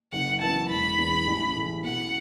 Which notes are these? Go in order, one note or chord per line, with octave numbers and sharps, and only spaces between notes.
F#1 F#5
F#2 E3 B3 E4 A5
E1 B5
E2 E3
A1
A2 E3
B2 F#5